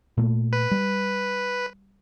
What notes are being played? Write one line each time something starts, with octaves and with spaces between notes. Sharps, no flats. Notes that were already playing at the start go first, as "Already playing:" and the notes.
A#2 A3
B4
G3